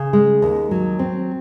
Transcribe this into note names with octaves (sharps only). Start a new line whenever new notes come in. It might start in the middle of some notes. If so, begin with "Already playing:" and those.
Already playing: C#3
G#3
D#2
F#3
C4